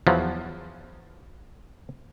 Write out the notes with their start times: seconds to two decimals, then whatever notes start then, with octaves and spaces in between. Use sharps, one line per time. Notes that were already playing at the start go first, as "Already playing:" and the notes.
0.07 E2 F3 F#3